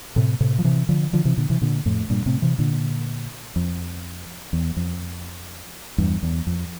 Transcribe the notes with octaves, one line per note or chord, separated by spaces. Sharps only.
A2 C3
A2 C3
F3
C3 E3
D3 F3
D3 F3
C3 E3
A#2 D3
C3 E3
A#2 D3
F2 A2
G2 A#2
A2 C3
C3 E3
A#2 D3
F2
E2
F2
E2 G2
E2
F2